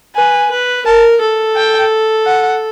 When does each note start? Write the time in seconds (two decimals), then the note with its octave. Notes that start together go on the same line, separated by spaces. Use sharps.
0.15 B4 G#5
0.51 B4
0.86 A#4 A5
1.21 A4
1.56 G5
2.26 F#5